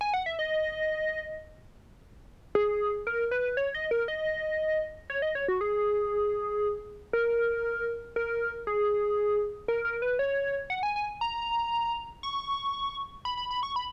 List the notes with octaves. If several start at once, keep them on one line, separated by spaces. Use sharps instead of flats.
G#5
F#5
E5
D#5
G#4
A#4
B4
C#5
D#5
A#4
D#5
C#5
D#5
C#5
F#4
G#4
A#4
A#4
G#4
A#4
A#4
B4
C#5
F#5
G#5
G#5
A#5
C#6
B5
B5
B5
C#6
B5